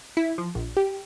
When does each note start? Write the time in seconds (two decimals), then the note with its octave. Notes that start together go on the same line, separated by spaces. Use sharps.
0.17 E4
0.38 F3
0.55 A#1
0.77 G4